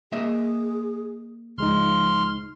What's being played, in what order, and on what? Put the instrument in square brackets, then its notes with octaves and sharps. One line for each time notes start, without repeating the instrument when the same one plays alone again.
[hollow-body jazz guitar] A#3 D#5 E5 [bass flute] G#4
[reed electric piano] C#2 G#3 D#4 [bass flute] F3 [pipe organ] C6 F6